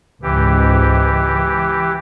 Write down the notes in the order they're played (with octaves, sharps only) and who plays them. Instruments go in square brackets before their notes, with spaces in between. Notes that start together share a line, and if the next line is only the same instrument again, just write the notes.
[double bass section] C#2 G#2 [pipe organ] E3 G4